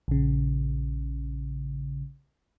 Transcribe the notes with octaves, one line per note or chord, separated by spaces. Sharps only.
A#1 C#3